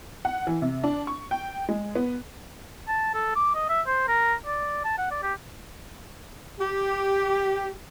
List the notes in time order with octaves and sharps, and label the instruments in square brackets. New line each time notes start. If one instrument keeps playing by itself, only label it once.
[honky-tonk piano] F#5
E3
C3
D4
C#6
G5
G#3
B3
[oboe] A5
A4
D6
D#5
E5
C5
A#4
D5
A5
F#5
D5
G4
[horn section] G4